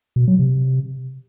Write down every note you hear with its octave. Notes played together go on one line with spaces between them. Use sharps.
B2
F#3
C3